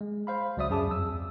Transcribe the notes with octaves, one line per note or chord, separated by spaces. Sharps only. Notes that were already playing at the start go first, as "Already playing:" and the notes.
G#3
C5 F5 B5
C#2 F#3 D5 E5 D#6
F#2 G#4 A5 D6 D#6
F2 E6